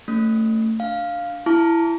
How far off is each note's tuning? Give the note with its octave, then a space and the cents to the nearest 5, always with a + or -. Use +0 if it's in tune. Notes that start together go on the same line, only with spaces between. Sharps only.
A3 +20 C#4 +0
D4 +0 F5 +0
E4 +15 A5 +0 D6 -40